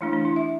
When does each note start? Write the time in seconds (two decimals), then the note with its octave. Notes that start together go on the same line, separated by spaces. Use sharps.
0.01 E3 A3 D4 E4
0.13 D4
0.25 E4
0.36 E5